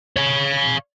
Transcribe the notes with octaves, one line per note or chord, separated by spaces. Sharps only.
C#5 F5